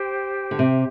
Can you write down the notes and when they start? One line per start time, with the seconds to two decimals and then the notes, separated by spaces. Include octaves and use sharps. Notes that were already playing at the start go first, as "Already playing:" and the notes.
Already playing: G4 C5 G5
0.51 D3
0.59 C3